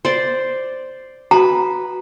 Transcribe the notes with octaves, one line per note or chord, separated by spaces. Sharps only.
C5 D5
F#4 B4 A#5